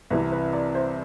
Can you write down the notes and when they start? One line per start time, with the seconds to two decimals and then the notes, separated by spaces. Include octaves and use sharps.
0.10 C2 C3 E3 B4
0.32 B4
0.53 D5
0.75 C5